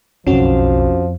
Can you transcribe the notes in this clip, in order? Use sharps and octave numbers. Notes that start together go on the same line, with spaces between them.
F#1 B1 F2 F3 C#4 F#4